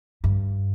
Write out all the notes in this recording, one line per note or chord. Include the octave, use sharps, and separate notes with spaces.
G2